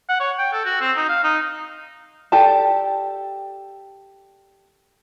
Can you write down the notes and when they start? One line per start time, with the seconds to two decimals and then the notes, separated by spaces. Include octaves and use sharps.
0.09 F#5
0.20 C#5
0.38 G5
0.53 A4
0.65 F#4
0.81 C4
0.97 D#4
1.09 F5
1.24 D#4
2.32 G4 A4 D5 A5